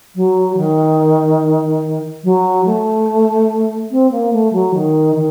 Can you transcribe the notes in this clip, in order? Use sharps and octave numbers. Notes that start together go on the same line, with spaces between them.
F#3
D#3
F#3
A3
C4
A#3
A3
F#3
D#3
D#3